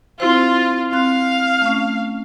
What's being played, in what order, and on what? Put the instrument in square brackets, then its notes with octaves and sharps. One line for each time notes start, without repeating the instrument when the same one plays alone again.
[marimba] C4 E4 C5 [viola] F4
[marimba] C4 C6 F#6 [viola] F5
[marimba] A3 C#4